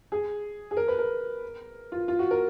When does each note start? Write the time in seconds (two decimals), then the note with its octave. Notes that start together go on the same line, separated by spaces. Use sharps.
0.12 G#4
0.71 G#4
0.77 A#4
0.88 B4
0.98 A#4
1.92 F4
2.08 F4
2.19 F#4
2.31 A#4